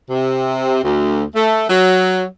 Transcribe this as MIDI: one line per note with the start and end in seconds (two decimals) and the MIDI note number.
0.10 0.81 48
0.83 1.23 38
1.34 1.64 57
1.68 2.24 54